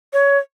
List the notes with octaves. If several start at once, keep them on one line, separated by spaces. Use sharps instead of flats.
C#5